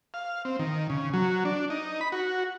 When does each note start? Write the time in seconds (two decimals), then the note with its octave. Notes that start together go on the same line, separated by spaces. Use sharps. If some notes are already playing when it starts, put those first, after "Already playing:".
0.14 F5
0.45 C4
0.59 D#3
0.90 C#3
1.13 F#3
1.45 D4
1.70 D#4
2.01 B5
2.12 F#4